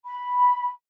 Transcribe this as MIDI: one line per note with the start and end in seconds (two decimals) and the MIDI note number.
0.06 0.69 83